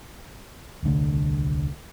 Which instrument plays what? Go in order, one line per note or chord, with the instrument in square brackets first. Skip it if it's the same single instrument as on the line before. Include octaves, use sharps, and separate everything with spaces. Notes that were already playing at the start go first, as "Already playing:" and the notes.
[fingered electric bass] D#1 C2 D3 A3